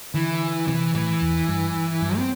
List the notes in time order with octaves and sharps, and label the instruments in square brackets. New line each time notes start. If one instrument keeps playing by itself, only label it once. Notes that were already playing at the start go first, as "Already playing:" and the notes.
[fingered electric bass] D3 [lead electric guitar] E3
[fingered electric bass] C3 [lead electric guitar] E3
[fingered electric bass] A2 [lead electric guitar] E3
[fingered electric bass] E2
G2
G2
[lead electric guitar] C4